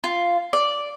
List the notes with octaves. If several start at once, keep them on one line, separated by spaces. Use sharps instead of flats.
F4
D5